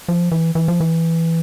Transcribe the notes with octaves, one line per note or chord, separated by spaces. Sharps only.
F3
E3
E3
F3
E3